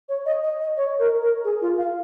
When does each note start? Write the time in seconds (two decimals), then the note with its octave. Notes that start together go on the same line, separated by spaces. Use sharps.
0.09 C#5
0.26 D#5
0.43 D#5
0.60 D#5
0.77 C#5
0.99 A#4
1.22 A#4
1.44 G#4
1.61 F4
1.78 F5